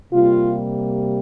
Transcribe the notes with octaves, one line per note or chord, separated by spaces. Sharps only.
C3 G3 A#3 F4